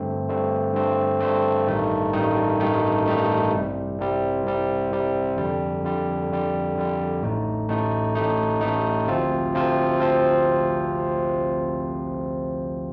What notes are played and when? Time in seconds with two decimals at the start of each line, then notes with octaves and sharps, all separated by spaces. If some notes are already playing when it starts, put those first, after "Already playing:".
Already playing: G2 D3 A3 C4
0.29 G2 D3 A3 C4
0.74 G2 D3 A3 C4
1.21 G2 D3 A3 C4
1.67 A1 G2 D#3 A3 D#4
2.13 A1 G2 D#3 A3 D#4
2.60 A1 G2 D#3 A3 D#4
3.05 A1 G2 D#3 A3 D#4
3.52 C2 C3 G3
3.99 C2 C3 G3
4.45 C2 C3 G3
4.91 C2 C3 G3
5.37 F2 D3 G3
5.83 F2 D3 G3
6.30 F2 D3 G3
6.76 F2 D3 G3
7.23 A1 A2 A3 D#4
7.69 A1 A2 A3 D#4
8.15 A1 A2 A3 D#4
8.61 A1 A2 A3 D#4
9.07 D2 C3 F3 C4 F4
9.53 D2 C3 F3 C4 F4
10.00 F3 C4 F4